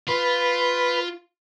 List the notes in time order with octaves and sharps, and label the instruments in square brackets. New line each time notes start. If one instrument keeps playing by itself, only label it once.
[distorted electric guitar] F4 [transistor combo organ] B4